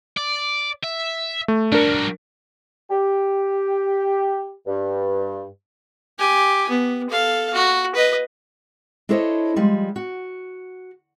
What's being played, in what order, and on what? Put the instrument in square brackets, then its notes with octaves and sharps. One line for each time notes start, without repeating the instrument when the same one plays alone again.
[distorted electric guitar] D5
E5
[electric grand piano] A3
[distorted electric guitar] G3 F#4 [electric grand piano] D4 A#4
[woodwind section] G4
G2
[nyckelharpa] G4 G#5
B3
A4 F5
F#4
B4 D#5
[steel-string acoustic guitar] D4 E4 A4 C5 C#5 D#5
F3 G3 G#3
F#4